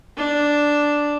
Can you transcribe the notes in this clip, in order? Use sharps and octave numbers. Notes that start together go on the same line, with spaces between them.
D4